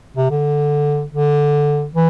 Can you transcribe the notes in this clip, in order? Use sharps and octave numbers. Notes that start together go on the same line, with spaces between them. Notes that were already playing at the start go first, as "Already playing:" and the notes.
C3
D3
D3
E3